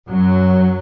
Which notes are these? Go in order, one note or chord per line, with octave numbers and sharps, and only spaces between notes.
F#2 F#3